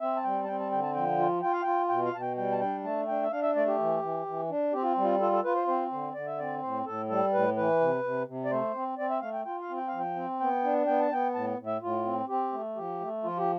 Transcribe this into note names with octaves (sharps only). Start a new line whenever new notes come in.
C4 E5
A5
G3 G5
A5
C4 G5
A5
D3 G5
A5
F3 G5
F4
F4 G5
F5
F4 G5
B2 G5
F5
B2 A5
G5
G3 G5
A5
D4 G5
A3 A5
D4 G5
E5
D4 F5
E5
A3 D5
G4
E3
E3
E3
D4
C4 G4
F4
G3
F4
F4 A4
A4
F4 B4
C5
C4 C5
D3 C5
D3 D5
E5
C4 D5
A2 C5
A2 A4
G3 A4
A2 B4
E3 B4
C3
C3
C3
D5
A3 C5
C4
C4 D5
E5
A3 F5
G5
F4 G5
F5
C4
G5
F3 F5
G5
C4
B3 G5
D4
B3 G5
A5
B3 G5
A2 A5
A2
E5
A2 F4
C4
C4 G4
A3
F3 G4
A3
F3 F4
G4